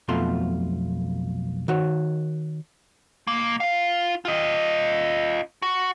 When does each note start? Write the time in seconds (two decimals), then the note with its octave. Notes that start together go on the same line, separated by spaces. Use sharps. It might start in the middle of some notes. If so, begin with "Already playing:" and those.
0.08 B1 F2 B2 A3 F4 C6
1.68 D#3 F#4 C#5
3.27 B1 A#3
3.60 F4 F5
4.25 F4 D#5
5.62 F#4